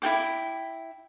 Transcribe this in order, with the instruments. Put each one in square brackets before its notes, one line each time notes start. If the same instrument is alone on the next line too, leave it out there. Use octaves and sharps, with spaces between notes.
[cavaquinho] E4 A4 G5 D6